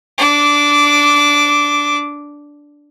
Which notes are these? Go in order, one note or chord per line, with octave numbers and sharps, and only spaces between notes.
D4 D6